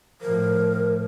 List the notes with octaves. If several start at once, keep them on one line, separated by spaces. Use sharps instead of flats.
A2 F3 A#4